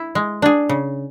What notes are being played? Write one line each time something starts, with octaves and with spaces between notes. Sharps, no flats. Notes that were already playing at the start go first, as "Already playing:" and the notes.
Already playing: E4
G#3
D4 G#4
C#3